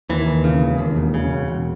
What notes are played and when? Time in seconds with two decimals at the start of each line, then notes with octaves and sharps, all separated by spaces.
0.09 D#2 E3
0.26 D#2
0.44 C#3
0.61 E1
0.78 D#2
0.96 E1
1.14 C#3
1.31 E1
1.48 E1